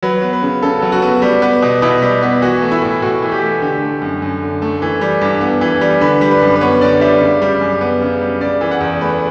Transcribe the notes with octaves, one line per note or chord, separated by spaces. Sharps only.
F#3 B4
B3
B4
C#3
C#3 A4
F#3
F#4
B3
G3
B3
B2
B2 E4
G3
B3
E3 F#4
A3
E4
A2
A2 F#4
E3
G4
A3
D3 G4
A3
F#2
F#2
D3
A3
E3
G3
G2
B3
E3
G3
D3 B4
G3
B4
F#2
B4
B3 C#5
D3 D5
G3 E5
C#3
G3
F#2
B3
C#3
G3
C#3 D5
E3
F#5
E2
A3 B4